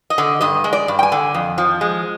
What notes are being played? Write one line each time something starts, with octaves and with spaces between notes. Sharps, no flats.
D#5
D3
G2 D#5
G#3
D5
G2
G5
G#5
D3
F2
F3
G#3